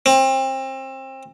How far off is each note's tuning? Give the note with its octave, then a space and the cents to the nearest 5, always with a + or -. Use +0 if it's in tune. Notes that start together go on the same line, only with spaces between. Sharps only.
C4 +30